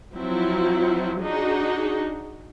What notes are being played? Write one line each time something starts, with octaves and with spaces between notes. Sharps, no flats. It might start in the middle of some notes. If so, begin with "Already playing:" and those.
F3 F#3 C4 E4 F4
D4 D#4 F#4 G#4